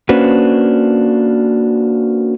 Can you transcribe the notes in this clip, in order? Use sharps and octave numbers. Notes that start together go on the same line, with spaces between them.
A#3 C#4 D4 F#4 B4 C5